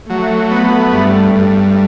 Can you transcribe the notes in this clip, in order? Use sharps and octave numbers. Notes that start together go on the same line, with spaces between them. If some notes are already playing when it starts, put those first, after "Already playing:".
F#3 A3
B3
G2
G2